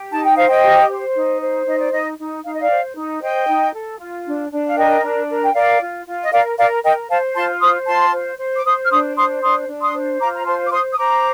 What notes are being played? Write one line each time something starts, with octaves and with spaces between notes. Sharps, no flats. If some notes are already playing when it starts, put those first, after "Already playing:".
Already playing: G4
D#4 A5
G5
C5 F5
D#5 G5
G4
C5
D#4
C5
D#4 D#5
D5
D#4 D#5
D#4
D#4 F5
D#5
D5 F5
C5
D#4
C5 D#5 G5
D#4
A4
F4
D4
D4
F5
A#4 D#5 G5
D4
A#4
G5
A#4 D5 F5
F4
F4
D#5
A#4 D5 F5
A#4 D5 F5
A#4 D#5 G5
C5 F5 A5
F4 A5 C6
C5 C6 D#6
F4 A5 C6
C5
C5
D6
C5 C6 D#6
F6
D4 C6 D#6
C5 C6 D#6
D4 C6 D#6
D4
C6 D#6
C5
F4 A#5 D6
A#5
C5 A5 C6
D6
C5 C6 D#6
D#6
C5 A#5 D6